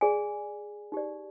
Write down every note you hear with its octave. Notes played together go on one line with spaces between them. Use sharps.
G#4 D5 G#5
D#4 G4 D5